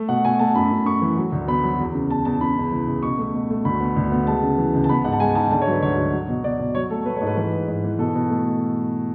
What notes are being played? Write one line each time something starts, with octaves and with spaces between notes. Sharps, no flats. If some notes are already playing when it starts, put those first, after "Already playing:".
Already playing: A3
B2 F#5
B2 G#5
A3 A5
F#2 B5
F#2
F#2 C#6
E3
F#3
D2
B3 B5
F#3
E2
C#3
E2 A5
E2 A5
C#3 B5
C#2
E3
C#2
B2 C#6
A3
B2
A3
D2 B5
B3
D2
B3
G#3 A5
C#3
E3
C#2
A5
B3 B5
G#2 F#5
A5
G#3 G#5
G#2 A5
D3 A5
C#5
F#3
B4
D2 C#5
F#3
F#3
B2
B2 D5
B2
F#3 C#5
A3 A4
A3 B4
C#5
G#2
B4
E3 B4
G#2
G#2
E3
B2 A4
B2
A3